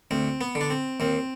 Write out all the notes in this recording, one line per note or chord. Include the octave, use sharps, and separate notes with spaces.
D2 C4
B3
D3
D4
C4
D#2 C4